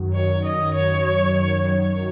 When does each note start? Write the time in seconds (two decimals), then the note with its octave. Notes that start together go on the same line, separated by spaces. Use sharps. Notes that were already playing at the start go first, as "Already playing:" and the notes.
Already playing: F#2 D#3 F#3
0.13 C#5
0.45 D#5
0.74 C#5
1.66 C#5